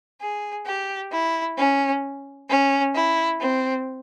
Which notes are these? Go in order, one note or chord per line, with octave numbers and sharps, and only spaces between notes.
G#4
G4
E4
C#4
C#4
E4
C4